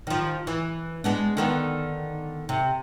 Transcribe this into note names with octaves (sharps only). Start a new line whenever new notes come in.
D#3 F3
E3
G#3 B3 D4
D3 D#3 B3
C3